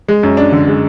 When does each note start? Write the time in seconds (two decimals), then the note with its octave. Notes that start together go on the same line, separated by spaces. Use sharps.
0.08 G#3
0.23 F#2
0.37 D4
0.52 D3
0.68 G#3